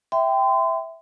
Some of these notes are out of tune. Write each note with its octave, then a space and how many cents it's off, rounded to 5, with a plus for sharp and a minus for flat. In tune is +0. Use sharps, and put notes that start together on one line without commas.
E5 +0 G5 +0 C6 -35